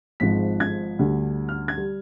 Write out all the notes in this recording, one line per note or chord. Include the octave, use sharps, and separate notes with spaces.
G#1 G#2 F3 B6
G#6
D2 D3 G3
F6
G#6
G3